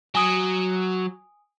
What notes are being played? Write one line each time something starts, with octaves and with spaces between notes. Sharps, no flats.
F#3 G#5 D#6 D7